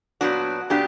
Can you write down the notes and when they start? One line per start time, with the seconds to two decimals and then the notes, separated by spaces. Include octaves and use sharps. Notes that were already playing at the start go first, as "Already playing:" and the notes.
0.21 A#2 F#3 B3 D4 F#4
0.70 A#2 F#3 B3 D4 G4